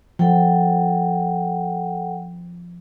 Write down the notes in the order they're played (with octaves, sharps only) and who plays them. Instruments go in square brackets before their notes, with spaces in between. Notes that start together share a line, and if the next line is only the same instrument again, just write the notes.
[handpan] F3 [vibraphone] A4 F#5 G5